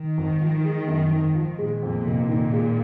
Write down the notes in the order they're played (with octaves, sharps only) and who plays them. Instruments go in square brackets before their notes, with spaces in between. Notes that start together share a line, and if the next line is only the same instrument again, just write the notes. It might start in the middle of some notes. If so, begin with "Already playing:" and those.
Already playing: [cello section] D#3
[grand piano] G#1
F3
G#3
F#2
G#1
F3
[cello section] A#2 [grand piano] G#3
[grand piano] F2
F1
D#3
G#3